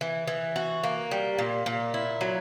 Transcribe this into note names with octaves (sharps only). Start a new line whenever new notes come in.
E3
E3
F#4
A#3
G3
A#2
A#2
E4
F#3